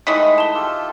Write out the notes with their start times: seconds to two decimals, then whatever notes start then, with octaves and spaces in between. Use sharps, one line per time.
0.07 D#3 E3 G#3 A3 D#5 D#6 B6
0.38 A5 G7
0.54 F4 G4 A4